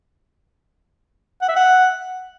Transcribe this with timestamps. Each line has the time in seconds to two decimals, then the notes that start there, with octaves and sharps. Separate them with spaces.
1.41 F#5
1.49 E5
1.56 F#5